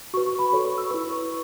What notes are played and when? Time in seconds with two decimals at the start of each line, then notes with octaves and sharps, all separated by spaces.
0.14 F#4 B4 C#6
0.26 C#6
0.39 B5
0.52 F#4 A4 C#5
0.65 C#6
0.78 E6
0.91 E4 B4 C#6
1.10 E6